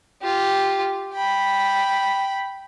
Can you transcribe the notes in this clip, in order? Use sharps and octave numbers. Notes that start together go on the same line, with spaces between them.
F4 G4
G5 B5